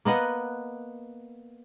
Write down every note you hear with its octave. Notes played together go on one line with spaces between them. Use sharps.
A#3 B3 D#5 F#5